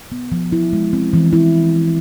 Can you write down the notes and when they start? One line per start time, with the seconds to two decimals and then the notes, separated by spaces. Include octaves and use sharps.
0.12 B3
0.32 F3
0.52 E4
0.73 G#3
0.93 C4
1.13 E3
1.33 E4